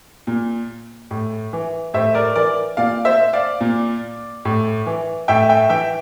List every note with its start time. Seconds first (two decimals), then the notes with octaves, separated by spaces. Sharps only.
0.27 A#2
1.11 A2
1.53 E3
1.94 A2 C5 E5
2.15 A#4 D5
2.35 E3 A#4 D5
2.77 A#2 D5 F5
3.05 C5 E5
3.33 D5 F5
3.61 A#2
4.45 A2
4.86 E3
5.28 A2 E5 G5
5.49 E5 G5
5.69 E3 E5 G5